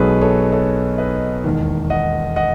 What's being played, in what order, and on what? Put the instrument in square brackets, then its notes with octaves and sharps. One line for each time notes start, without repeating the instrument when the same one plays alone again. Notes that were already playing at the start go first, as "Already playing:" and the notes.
Already playing: [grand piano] B1 B2 G#3 G#4 A4 B4 C#5
A4 C#5
A4 C#5
B4 D#5
E1 D#2 D#3
D#5 F#5
D#5 F#5